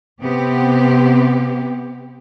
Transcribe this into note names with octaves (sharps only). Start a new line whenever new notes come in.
C3 B3 C4 G4